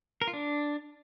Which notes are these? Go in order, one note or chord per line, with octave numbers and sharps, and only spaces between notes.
A#4
F4
D4